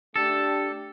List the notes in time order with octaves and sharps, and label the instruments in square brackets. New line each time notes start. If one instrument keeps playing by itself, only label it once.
[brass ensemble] A3 D4 G4 [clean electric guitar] A4